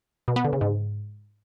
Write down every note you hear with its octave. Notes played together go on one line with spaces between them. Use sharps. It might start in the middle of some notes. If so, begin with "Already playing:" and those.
B2
B3
D3
C#3
G#2